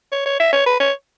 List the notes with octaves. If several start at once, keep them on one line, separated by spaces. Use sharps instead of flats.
C#5
C#5
E5
C#5
B4
C#5